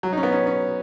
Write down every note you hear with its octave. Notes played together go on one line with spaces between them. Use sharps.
F#3
D#4
C#4
B3
C#4
C#4